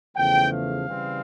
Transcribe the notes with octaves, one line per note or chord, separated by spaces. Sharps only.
E2 C#3 F3 A3 G5
F5
C#3 E3 G3 C4